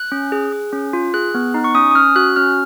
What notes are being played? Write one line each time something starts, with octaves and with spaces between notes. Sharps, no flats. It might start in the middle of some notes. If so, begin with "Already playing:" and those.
Already playing: F#6
C#4
G#4
G#4
C#4
F4
G#4 F#6
B3
D#4
C#6
C#4 D#6
D#6
C#4 F6
F#4 F#6
C#4 F6